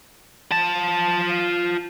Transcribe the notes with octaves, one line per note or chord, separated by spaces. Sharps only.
F4 A5